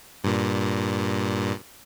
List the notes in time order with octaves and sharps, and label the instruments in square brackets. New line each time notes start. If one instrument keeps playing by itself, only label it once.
[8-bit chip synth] G2 A#2